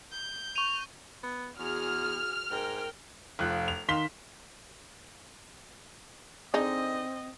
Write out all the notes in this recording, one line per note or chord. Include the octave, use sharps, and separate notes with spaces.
G6
C#6 D#7 F7
B3
E2 F#4 G#4 F6
G#2 A#4 G5
F1 F3 F4 F#6
F7
D#3 F5 C6 B6 G7
D3 C4 D#4 G#4 D#5